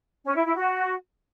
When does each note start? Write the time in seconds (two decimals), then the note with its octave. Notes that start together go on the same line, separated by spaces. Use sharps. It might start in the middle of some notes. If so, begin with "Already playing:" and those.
0.24 C#4
0.35 E4
0.45 E4
0.55 F#4